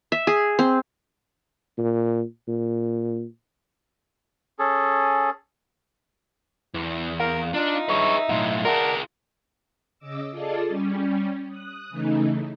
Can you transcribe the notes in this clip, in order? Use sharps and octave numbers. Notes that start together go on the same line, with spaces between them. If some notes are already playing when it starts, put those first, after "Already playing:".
E5
G#4
C4
A#2
A#2
C#4 G#4 A4
E2 E3
A#4 F5
D4 D#4 F4
G2 G#4 B4 C#5 E5
B1 A2 F4
F4 G#4 A#4 D5 F#5 A5
C#3 D#5 D6 E6
F4 G#4 A4 D5 D#5 A5
G3 C#4
D#6 F#6
C#3 E3 A3 D#4